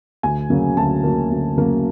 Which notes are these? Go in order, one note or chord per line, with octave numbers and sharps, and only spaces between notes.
D2 G#5
C#3 F#3 A#3
D2 A5
C#3 F#3 A#3
D2
C#3 F#3 A#3